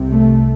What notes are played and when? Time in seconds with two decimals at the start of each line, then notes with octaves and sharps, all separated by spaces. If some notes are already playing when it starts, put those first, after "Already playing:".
Already playing: C2 C3
0.09 A3